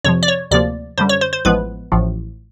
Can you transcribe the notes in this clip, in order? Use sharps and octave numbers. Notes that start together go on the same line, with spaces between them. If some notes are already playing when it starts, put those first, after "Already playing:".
F2 C3 F3 C#5
D5
C#5
D2 C3 F3 A#3 D5
F#2 D3 G3 C5
C#5
C5
C5
A1 A2 F3 G#3 B3 B4
A1 A2 F3